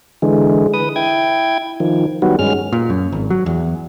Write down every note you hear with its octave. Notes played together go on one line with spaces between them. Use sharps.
D3 E3 G#3
B4 D#6
E4 G5 G#6
D#3 F3
D#3 F#3 G3 B3 F#4
G2 G#3 C#4 F6
A#2
F#2
G#1
F#3
E2